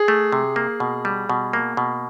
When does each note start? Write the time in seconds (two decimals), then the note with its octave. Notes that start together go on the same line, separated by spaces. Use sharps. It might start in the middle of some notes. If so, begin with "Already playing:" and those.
Already playing: G#4
0.08 A3
0.32 C3
0.56 A#3
0.80 B2
1.05 G3
1.30 B2
1.53 A#3
1.77 B2